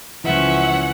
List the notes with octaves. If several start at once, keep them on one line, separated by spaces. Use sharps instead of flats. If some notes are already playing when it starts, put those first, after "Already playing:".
C#2 E3 F3 C#4 B4 E5 F#5